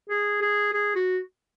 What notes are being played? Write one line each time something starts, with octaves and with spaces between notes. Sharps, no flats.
G#4
G#4
G#4
F#4